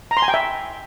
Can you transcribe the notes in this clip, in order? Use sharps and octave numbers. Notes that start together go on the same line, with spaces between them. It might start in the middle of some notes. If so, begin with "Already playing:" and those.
A#5
C6
G#5
G5
E5